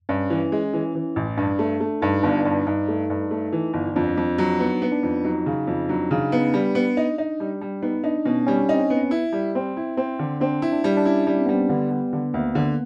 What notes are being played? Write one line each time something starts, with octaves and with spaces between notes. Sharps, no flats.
G2 C#4
E3
G#3
E3
E3
A1
G2 D4
A3
A3
G2 D#4
G1 D4
G2 D4
G2 D#4
A3
G2
A3
E3
G1
F2 D4
F2
F#3
B3 D#4
B3 D#4
D4
F2
F#3 D#4
C#3
F2
F#3 D4
C#3 D#4
B3 D#4
C#4
G3 D4
B3
D#4
D#4
G3
G3
B3 D#4
D4 D#4
B2 C#4
G3 C#4
C4 D#4
C#4
B3
E4
G3
C4
E4
C4
D3
C4 D4
E4
D4
G3
D4
C#4 E4
G3
C4
G3 B3
C4
D3 B3
G3
D3
D2 A#3
D3